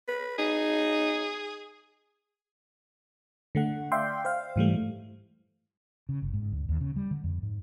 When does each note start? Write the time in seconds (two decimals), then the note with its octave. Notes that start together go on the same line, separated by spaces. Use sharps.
0.08 B4
0.38 D#4 G#4
3.55 D3 A3 F#5
3.92 D5 E5 F5 G5 C6
4.25 C5 F5
4.56 G#2 E3 G3 A3
6.09 C#3
6.22 G1
6.33 G#2
6.52 D2
6.69 D#2
6.81 C#3
6.96 G3
7.11 D3
7.24 F2
7.43 G#2